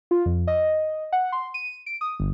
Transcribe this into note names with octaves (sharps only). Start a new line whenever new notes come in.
F4
F2
D#5
F#5
C6
D#7
D7
D#6
G1